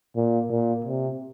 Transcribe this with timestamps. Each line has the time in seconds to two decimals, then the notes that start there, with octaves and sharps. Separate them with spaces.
0.16 A#2
0.49 A#2
0.84 C3